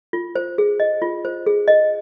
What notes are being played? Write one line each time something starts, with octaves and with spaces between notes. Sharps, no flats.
F4
C5
G#4
D#5
F4
C5
G#4
D#5